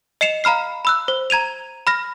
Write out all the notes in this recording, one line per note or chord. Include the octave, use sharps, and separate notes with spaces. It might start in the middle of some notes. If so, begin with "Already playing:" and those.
D#5 C7 C#7 E7 F7
F5 A#5 B5 F6 C7
B5 E6 F#6
C5
A#5 G#6 D#7 F7
B5 F6 A#6